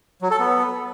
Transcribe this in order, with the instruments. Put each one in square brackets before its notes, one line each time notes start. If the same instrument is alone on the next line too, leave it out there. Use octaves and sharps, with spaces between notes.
[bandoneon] F#3
A4
B3